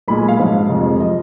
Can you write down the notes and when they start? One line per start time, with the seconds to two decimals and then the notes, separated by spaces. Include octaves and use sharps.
0.08 B1 A#2 G#3 B5
0.18 G#5
0.28 F5
0.39 A#1 G#2 F#3 F5
0.69 F1 F2 F3 G#3
1.00 F3 D#5